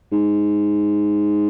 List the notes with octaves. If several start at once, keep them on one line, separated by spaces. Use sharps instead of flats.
G#2